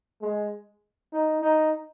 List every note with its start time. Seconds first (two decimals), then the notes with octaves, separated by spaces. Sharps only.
0.21 G#3
1.13 D#4
1.42 D#4